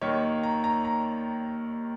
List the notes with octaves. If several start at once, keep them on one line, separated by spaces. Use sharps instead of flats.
D#2 D#3 A#3 D#4 C#5
A#5
A#5
A#5